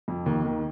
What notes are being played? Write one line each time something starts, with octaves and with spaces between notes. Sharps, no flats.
F2 F3
D#2 D#3
D#2 D#3